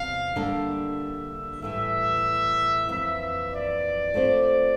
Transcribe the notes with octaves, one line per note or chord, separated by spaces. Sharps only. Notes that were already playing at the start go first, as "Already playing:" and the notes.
Already playing: E2 C3 G3 F5
D3 G3 A#3 D4 G4 E5
A2 E3 G3 E5
F2 E3 A#3 E5
E5
D5
A3 C4 F4 C5